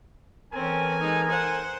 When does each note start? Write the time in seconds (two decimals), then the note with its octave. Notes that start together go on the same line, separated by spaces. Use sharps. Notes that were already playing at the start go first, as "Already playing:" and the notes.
0.53 E3 C4 C#4 A4 A#4 G#5
1.00 G#3 D#4
1.29 C5 F#5